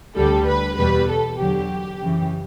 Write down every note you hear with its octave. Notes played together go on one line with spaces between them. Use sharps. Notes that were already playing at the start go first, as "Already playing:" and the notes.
D2 D3 G3 A4
B4
E2 B2 G3 B4
A4
E2 D3 F#3 G4
F#2 C#3 E3